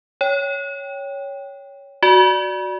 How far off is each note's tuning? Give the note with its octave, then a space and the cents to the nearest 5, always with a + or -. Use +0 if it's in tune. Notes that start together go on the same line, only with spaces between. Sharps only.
C#5 +5 G5 +0
F#4 +0 D5 +0